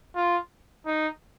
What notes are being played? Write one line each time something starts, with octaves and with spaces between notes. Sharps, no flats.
F4
D#4